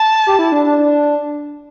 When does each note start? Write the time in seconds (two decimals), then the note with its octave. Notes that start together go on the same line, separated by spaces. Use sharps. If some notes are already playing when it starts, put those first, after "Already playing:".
Already playing: A5
0.27 G4
0.39 E4
0.52 D4
0.66 D4
0.78 D4